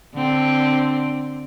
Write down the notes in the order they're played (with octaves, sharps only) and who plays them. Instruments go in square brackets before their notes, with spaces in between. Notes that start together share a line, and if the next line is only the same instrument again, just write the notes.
[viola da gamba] D3 C4